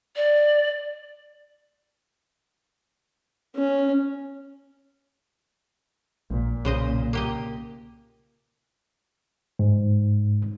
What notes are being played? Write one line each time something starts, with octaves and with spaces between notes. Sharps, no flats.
D5
C#4
A#1 A#2
B1 C#3 C5 D#5
A#3 G4 D#5
G#2